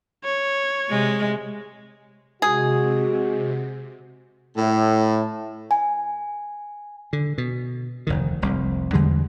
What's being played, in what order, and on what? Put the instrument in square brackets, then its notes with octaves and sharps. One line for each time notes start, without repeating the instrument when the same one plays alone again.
[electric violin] C#5
[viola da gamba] C3 G#3
[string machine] C3 [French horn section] G#3 F#4 [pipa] G#4
[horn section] A2
[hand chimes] G#5
[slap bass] D3
B2
F1 D2 D#3
F1 C2
E2 D3 G3 G#3